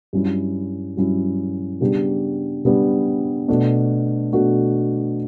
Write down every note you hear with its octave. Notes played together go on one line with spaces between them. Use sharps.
G2 F#3 C#4 E4
G2 F#3 C#4 E4
C#3 G3 B3 D4 G4
C#3 G3 B3 D4 G4
B2 A3 D4 F#4
B2 A3 D4 F#4